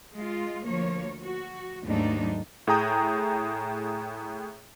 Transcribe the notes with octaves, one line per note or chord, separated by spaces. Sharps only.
G#3 F4
D2 F3 A#3 C#5
F#4
D#2 G#2 F#3 A3 D4 D#4
A2 G#4 G5 A#5 D#6 G6